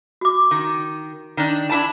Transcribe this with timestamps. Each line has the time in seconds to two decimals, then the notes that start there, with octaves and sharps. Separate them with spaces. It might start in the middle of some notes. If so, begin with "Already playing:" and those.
0.21 F#4 D6
0.51 D#3
1.37 D#3 D4
1.69 D4 E4 A5